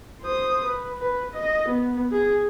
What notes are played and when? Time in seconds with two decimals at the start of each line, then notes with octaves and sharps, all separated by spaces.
0.22 C5 D#6
0.65 B4
1.01 B4
1.34 D#5
1.68 B3
2.12 G#4